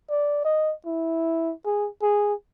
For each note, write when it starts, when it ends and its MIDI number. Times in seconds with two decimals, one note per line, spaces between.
0.10 0.42 74
0.45 0.73 75
0.86 1.53 64
1.66 1.88 68
2.02 2.34 68